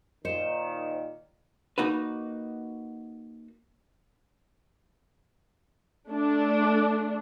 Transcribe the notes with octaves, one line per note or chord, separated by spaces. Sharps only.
A#2 D#3 C5 D#5 C#7 E7
A#3 D#4 F#4 B4
A3 D4